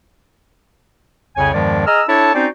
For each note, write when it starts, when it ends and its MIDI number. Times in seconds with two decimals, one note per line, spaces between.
1.36 1.50 36
1.36 1.50 41
1.36 1.50 49
1.36 1.50 73
1.36 1.50 80
1.54 1.84 40
1.54 1.84 43
1.54 1.84 51
1.54 1.84 53
1.54 1.84 56
1.54 1.84 74
1.87 2.03 68
1.87 2.03 75
1.87 2.03 82
1.87 2.03 88
1.87 2.03 89
2.08 2.32 62
2.08 2.32 64
2.08 2.32 69
2.08 2.32 73
2.08 2.32 81
2.35 2.48 60
2.35 2.48 61
2.35 2.48 63
2.35 2.48 66
2.35 2.48 72
2.35 2.48 74